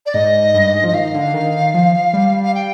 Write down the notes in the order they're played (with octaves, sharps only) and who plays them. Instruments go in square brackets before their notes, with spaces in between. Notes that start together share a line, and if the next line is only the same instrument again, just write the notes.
[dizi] D5
[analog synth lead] G#2 [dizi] D#5
[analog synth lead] G2
G#2
[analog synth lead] F3 [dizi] D#5
[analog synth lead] D#3 [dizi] F5
[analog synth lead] D3
D#3
F3
G3
[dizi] F5
G5